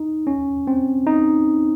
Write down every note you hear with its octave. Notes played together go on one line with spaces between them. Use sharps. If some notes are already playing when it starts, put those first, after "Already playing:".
Already playing: D#4
C#4
C4
D#4